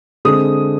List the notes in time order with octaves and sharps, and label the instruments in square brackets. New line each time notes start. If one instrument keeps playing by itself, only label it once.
[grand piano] D3 G#3 C4 D#6